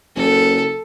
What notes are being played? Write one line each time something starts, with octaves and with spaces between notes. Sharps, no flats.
F#1 A4